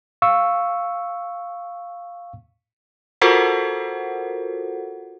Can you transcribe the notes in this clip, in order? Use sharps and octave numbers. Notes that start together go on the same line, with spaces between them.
F5 C#6 E6
F4 F#4 A4 A#4 C5 F#5